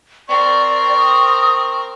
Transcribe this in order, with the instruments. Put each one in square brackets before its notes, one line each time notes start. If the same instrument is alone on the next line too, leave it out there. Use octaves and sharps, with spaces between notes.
[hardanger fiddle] C4 A#4 [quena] D5 [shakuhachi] C#6
[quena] D#6